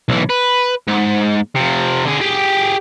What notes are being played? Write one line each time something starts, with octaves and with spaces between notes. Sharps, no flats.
B1 E3
B4
G#2
C3 F3
D3 G#4
G4 G#4